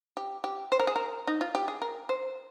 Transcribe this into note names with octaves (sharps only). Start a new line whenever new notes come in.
G4
G4
C5
A#4
G#4
A#4
D#4
F4
G4
G#4
A#4
C5